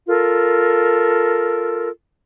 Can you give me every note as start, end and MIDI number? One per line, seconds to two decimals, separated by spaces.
0.07 1.89 65
0.07 1.89 69
0.07 1.89 70